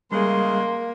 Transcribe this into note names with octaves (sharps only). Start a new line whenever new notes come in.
C#3 E3 G3 G#3 A#3 G#4 C6